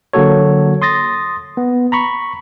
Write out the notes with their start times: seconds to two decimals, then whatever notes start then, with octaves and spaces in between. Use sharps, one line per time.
0.13 D3 F#3 A#3 F#4 A4 C#5
0.82 C6 D#6 A6 A#6
1.57 B3
1.92 A#5 B5 C#6